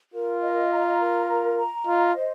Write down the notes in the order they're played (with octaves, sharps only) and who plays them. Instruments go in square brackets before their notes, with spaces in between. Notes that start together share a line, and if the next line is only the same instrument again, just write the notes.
[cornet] F4 [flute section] A#4
[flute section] D#5
A#5
A#4
A#5
A#5
[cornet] F4 [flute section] D#5
[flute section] C5